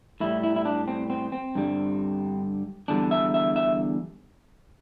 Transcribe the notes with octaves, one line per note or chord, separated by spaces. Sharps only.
A2 G3 E4
E4
E4
D4
C4
C4
C4
G2 D3 G3
E2 D3 G3 D4
E5
E5
E5